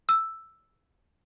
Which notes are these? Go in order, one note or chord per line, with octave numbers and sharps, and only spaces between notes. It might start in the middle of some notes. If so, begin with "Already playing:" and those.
E6